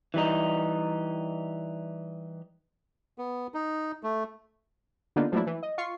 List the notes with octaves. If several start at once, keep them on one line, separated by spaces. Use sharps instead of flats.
E3 G3 D#4
B3
D#4
A3
D3 A#3 B3 D4 D#4 F4
F3 F#3 A3 A#3 D4 E4
E3
D#5
F4 C#6 C7